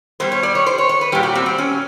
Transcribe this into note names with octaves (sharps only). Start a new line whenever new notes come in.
B2 G3 C5
C#5
D5
C#5
C5
C#5
C#5
B4
A#2 G3 G4
F#4
C4
C4
C#4